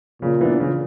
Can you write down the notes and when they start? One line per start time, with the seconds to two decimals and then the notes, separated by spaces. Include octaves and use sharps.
0.22 A#2 C#3
0.41 E3 B3 D4
0.60 C#3